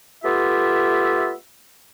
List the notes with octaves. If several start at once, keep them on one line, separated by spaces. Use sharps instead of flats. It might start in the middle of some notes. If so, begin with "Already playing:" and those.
A3 B3 F4 G4 E5